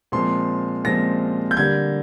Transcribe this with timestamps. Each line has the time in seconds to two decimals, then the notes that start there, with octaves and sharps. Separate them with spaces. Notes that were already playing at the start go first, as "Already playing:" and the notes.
0.12 A#2 F3 G#3 C4 C6
0.84 A#2 F3 G#3 C4 A#6
1.51 G6
1.57 D3 G3 A#3 G#6